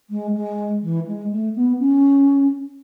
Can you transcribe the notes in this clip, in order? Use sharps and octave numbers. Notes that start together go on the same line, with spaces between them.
G#3
G#3
E3
G#3
A3
B3
C#4